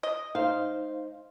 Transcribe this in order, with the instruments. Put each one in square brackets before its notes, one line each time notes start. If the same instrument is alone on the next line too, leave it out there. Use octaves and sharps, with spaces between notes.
[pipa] D#5
[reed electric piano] D#4 C5 [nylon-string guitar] F5